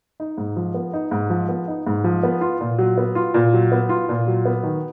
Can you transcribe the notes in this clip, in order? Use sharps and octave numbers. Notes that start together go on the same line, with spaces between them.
D#4
G#2
F3
B3
D#4
G#2
F3
B3
D#4
G#2
F3
B3
F4
A#2
F#3
B3
F4
A#2
F#3
B3
F4
A#2
F#3
B3
D#3